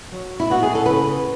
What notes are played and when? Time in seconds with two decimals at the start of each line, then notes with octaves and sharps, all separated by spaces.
0.12 F#3
0.40 E4
0.50 B3 D#4 F#4
0.63 G#4
0.75 A4
0.86 C#3 B4